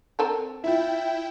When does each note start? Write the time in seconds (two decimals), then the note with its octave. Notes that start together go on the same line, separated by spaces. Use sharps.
0.19 C4 A4 A#4
0.64 E4 F4 E5 G5